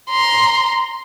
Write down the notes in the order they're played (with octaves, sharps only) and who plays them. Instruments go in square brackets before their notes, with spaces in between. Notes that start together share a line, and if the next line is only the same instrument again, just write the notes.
[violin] A#5 C6